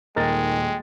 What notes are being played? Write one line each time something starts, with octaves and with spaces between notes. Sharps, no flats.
D#1 G#3 D#4 A#4 D#5 G5 A6